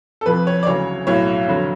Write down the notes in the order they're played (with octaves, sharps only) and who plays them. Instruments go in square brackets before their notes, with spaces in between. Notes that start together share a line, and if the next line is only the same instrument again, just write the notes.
[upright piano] A4
F1 F2 F3 B4
C#5
D5
D2 C#3 F#3 C#5
B1 A2 F#3 C#5
F1 F2 D3 F#3